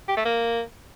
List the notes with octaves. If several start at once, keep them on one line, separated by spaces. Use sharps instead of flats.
G4
A3
A#3